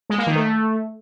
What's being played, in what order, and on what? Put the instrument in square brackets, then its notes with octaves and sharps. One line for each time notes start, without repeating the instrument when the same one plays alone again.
[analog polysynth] G#3
A#3
D#3
A3